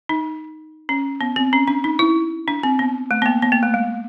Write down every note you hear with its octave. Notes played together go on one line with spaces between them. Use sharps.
D#4
C#4
B3
C4
C#4
D4
D#4
E4
D4
C4
B3
A3
B3
A#3
B3
A#3
A3
G#3